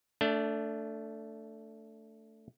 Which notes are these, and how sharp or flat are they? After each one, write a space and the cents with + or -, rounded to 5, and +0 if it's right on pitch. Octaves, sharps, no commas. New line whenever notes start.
A3 +10 D4 -15